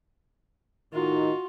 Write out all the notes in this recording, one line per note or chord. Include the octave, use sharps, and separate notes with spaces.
A2 D#3 D#4 F4 F#4